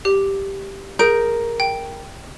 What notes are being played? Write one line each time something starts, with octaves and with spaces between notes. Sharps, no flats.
G4
G#4 A#4 G6 D7
G5